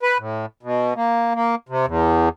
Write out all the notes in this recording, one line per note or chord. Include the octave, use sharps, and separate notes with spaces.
B4
A2
B2
A#3
A#3
C3
E2